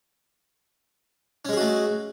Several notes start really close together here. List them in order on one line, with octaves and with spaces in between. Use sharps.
C#4 G#3 G#4 F#4 A3